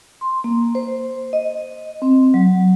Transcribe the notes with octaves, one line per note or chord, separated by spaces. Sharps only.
C6
A#3
C5
D#5
C4
F#3